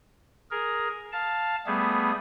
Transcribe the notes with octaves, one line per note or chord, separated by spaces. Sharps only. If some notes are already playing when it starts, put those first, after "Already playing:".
G#4 A#4
F5 A5
G3 A3 B3 G#4